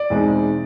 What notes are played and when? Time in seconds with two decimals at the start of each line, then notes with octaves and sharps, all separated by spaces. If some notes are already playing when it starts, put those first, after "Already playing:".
Already playing: D5
0.10 E2 B2 G#3 C4 D#4